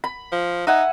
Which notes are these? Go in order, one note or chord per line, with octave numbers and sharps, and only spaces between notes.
B5
F3
D#4 E5 F#5 G#5